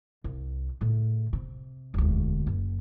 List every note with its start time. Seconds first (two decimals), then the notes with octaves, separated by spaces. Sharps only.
0.24 C2
0.81 A2 C#3
1.33 C3
1.94 E1 D2
2.47 F#1